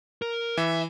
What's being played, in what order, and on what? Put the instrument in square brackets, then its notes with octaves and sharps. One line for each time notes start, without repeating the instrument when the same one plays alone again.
[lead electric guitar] A#4
[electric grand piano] E3 [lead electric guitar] E5